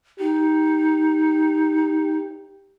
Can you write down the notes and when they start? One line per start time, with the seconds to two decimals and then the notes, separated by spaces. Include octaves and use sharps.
0.20 D#4 G4